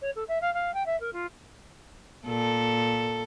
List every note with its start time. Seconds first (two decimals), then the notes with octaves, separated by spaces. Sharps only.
0.01 C#5
0.15 A4
0.28 E5
0.41 F5
0.54 F5
0.74 G5
0.86 E5
1.00 A#4
1.12 F4
2.26 A#2 A4